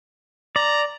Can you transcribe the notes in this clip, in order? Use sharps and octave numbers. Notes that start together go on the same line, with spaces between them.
D5 A#5